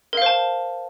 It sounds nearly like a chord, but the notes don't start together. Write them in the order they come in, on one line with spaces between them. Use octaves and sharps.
A#4 F5 C5 A5